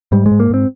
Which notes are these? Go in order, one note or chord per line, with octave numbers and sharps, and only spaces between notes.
G#2 G3
G#3
G#2
A#3
G#2 C4